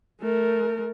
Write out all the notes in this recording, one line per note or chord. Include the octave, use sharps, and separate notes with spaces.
A3 A#4